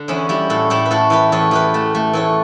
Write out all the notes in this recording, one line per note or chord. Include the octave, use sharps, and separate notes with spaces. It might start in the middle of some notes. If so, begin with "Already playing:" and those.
Already playing: D3
E2 C#4 E4
G3 E4 G4
A2 F#4 A4
A2 E4 G4
B4
A2 F#4 A4
E3 G4 B4
E2 A4 C#5
E2 G4 B4
A3
A3
E3 A4 C#5